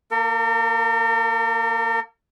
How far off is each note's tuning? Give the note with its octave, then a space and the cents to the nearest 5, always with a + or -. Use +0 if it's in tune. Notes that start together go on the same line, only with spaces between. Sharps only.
A#3 +0 A#4 -45